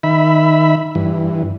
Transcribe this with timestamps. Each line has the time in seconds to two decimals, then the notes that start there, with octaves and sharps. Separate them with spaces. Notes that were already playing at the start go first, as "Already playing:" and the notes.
0.03 D#3 E5 B5
0.95 G2 E3